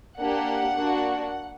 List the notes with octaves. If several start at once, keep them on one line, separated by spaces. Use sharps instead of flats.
A#3 D4 G4 F#5
A#3 D4 F#4